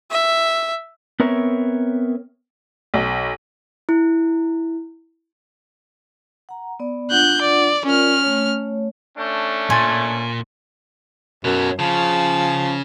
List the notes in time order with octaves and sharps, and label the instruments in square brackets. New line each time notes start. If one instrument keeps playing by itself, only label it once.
[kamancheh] E5
[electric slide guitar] B3 C4 A#4 C#5 E5
[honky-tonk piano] B1
[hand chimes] E4
[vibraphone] F#5 A#5
B3 D5
[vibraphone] D4 F4 F#5 [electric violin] F#6 G6
[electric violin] D5
[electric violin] C#4 F6 [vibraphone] F4 A#4 D5
[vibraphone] A3 C#5
[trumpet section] A3 C#4 D4
[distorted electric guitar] A#2 [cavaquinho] G#5 [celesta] C6 A6
[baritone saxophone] F#2 [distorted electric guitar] B2 F#3
[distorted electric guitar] C#3 [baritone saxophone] F3